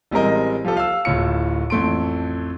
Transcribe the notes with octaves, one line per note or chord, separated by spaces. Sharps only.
A1 G3 G#3 C4 A#4 D#5
F3 F4 G4 A4
F5 E6
D1 A2 F4 C#7
A1 F2 A3 C6 D7